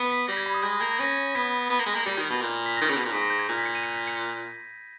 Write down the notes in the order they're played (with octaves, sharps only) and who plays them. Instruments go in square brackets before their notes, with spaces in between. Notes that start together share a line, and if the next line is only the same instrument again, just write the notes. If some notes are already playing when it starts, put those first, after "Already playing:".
Already playing: [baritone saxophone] B3
[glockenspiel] B6
[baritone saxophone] G3 [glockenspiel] A#6
[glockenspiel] G#6
B5
D#6
[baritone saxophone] G#3 [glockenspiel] G6
[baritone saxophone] A#3 [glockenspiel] G#6
[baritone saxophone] C#4 [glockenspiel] A#6
[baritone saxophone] B3 [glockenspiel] B6
[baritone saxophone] B3
A#3
G#3
A#3
[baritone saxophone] G3 [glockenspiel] C#7
[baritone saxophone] D#3
B2
A#2
[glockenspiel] B6
[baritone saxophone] D#3 [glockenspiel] A#6
[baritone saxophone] C#3
B2
A#2
[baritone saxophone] G#2 [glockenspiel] B6
[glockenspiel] A#6
G6
G#6
[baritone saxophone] A#2
[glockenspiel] B6
C#7
D#7
C#7
B6
C#7